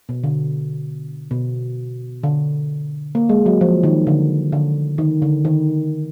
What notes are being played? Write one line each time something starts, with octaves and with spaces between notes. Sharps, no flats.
B2
D3
B2
D3
A#3
G#3
F#3
F3
D#3
D3
D3
D#3
D3
D#3